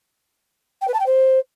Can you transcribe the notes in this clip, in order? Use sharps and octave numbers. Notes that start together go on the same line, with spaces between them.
G5
B4
A5
G5
C5